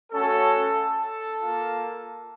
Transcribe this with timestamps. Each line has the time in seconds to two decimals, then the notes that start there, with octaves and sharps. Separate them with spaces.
0.11 A3 C#4 F#4 A4
0.77 A4
1.41 A#3 F4